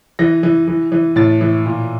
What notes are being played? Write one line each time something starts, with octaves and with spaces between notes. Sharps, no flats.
E3 A#6
E3
E3
E3
A2 A6
E3
A#2